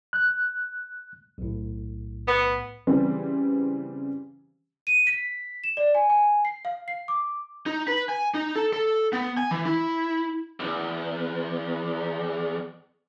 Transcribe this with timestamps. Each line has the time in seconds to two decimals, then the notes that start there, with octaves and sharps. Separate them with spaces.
0.13 F#6
1.38 B1 A2
2.28 B3
2.87 C#3 E3 G3 C4 G4
4.87 D#7
5.07 B6
5.64 E7
5.77 D5
5.95 G#5
6.10 G#5
6.45 C7
6.65 F5
6.88 C7
7.08 D6
7.66 D#4
7.88 B4
8.09 G#5
8.34 D#4
8.55 A4
8.73 A4
9.13 B3
9.37 G#5
9.51 E3
9.65 E4
10.60 B1 E2